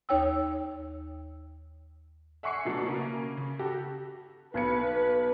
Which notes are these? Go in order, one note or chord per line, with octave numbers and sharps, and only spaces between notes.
D#2 D#4 C#5 G5 E6
E5 F#5 G#5 C#6 C7 C#7
B2 F#3 A3 D4
C#3 A#3 C#4
C#3
F#4 G4 A4
B1 B4 G#6 C#7